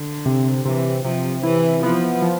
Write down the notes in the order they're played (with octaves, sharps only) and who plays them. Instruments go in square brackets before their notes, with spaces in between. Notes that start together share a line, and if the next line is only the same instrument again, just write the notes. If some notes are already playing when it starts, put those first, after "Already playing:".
Already playing: [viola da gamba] D3
[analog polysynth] C3
[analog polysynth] C3 [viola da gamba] E3
[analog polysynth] C3 [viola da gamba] F3
[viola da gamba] E3 [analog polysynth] E4
[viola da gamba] F3 [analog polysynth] B3
[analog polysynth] F3